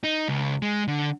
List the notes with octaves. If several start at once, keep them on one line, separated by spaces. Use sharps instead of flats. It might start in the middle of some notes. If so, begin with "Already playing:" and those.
D#4
C#2
G#3
D3